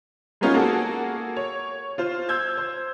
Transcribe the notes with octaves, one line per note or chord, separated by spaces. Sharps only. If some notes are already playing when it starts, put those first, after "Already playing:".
G#3 A#3 B3 C#4 D#4 F4
A#3 F#4 G#4 A4
C#5
F4 C5
E6 G6 G#6
C5